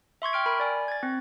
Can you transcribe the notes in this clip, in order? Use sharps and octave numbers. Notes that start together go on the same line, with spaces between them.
E5 C6 C#6 G#6
G5 F6 D7
A#4 B5
D5 G#5
G#6 A6
C4